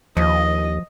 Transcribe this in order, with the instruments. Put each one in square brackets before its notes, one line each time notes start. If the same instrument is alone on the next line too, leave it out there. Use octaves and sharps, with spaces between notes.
[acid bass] D#2 [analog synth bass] F3 [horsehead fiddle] D#5